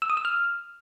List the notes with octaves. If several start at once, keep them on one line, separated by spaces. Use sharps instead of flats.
E6
D#6
E6
F6